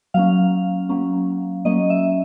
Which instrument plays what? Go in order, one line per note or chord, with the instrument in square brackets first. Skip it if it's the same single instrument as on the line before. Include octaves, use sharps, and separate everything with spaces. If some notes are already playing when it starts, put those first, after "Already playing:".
[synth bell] F#3 A#3 C#4 F5
F#3 A#3 C#4
F#3 A#3 C#4 D#5
E5